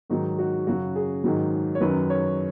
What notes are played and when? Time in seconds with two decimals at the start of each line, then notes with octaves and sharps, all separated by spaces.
0.10 G#2 D#3 F#3 D#4
0.39 F#4
0.67 F#2 C#3 F#3 F#4
0.96 G#4
1.24 G#2 D#3 F#3
1.75 C#5
1.81 F#2 D#3 F#3 B4
2.10 C#5